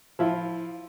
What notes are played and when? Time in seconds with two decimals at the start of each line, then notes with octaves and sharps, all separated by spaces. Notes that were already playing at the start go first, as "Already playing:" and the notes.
0.19 F3 E4 F4